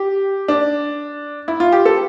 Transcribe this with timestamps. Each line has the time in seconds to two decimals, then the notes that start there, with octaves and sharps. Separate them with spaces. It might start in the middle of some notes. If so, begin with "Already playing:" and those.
Already playing: G4
0.48 D4
1.48 E4
1.60 F4
1.72 G4
1.85 A4